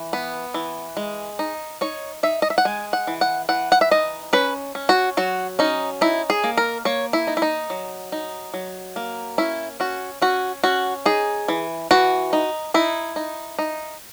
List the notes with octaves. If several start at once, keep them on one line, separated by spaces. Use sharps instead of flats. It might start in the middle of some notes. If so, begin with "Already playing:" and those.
Already playing: E3
B3
E3
G#3
D#4
D#4 C#5
D#4 E5
D#5
E5
F#5
G#3 G#5
F#5
E3
F#5
E3 F#5
F#5
E5
D#4 D#5
C#4 B4
C#4
F#4
F#3 F#4
C#4 D#4
D#4 E4
G#4
A#3
A#4
A#3 C#5
E4
D#4
E4
D#4
F#3
D#4
F#3
A#3
C#4 E4
C#4 F#4
C#4 F#4
C#4 F#4
D#4 G#4
E3
E3 F#4
D#4
D#4 E4
D#4
D#4